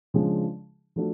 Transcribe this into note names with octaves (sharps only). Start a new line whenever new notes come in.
C#3 F3 G#3 D4 G#4
F3 A3 D4 F#4